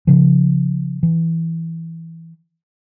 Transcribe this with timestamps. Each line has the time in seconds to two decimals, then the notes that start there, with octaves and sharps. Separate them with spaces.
0.07 C#3 F3
1.03 E3